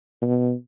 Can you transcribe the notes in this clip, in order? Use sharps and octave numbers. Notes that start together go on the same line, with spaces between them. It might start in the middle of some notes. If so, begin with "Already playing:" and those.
B2